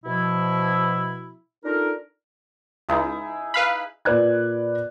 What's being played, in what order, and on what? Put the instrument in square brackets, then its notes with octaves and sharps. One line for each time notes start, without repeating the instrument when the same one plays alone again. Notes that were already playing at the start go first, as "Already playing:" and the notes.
[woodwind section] B2 F3 E4
D4 D#4 F4 A4 A#4
[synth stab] C#2 [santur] D#4 E4 G#4
[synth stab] B4 F5 B5
[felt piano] A#2 B4 D5 F#6 G#6